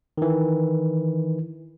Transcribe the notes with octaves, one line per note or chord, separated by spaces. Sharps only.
D#3 E3